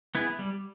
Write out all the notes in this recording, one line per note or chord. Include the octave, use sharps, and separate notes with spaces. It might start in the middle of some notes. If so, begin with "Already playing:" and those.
B3 E4 G#4
G3